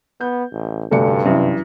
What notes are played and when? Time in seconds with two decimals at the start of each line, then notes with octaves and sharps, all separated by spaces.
0.21 B3 G6
0.51 A1
0.91 F1 D2 G2 A4 D5 C#7
1.26 F#2 C3 E3